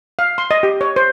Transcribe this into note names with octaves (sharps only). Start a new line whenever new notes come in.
F5
C6
D#5
G4
C#5
C5